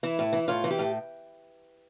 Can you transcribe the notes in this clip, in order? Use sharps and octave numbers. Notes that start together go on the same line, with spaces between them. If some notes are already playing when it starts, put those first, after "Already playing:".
E3 E4
A2
E3
A2 F4
E3
G4
A2